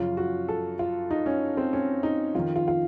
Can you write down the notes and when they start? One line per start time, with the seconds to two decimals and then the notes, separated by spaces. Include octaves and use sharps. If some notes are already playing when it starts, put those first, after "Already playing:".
Already playing: F#2 C#3 F3 F4
0.17 F#4
0.48 A4
0.79 F4
1.11 D#4
1.26 C#4
1.57 C4
1.73 C#4
2.03 D#4
2.35 F2 D#3 F4
2.56 F4
2.68 F4